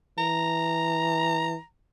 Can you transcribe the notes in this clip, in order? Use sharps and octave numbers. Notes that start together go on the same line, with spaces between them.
E3 A#5